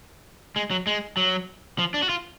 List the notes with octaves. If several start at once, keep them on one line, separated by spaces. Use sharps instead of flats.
G#3
F#3
G#3
F#3
F3
D4
F#4
F4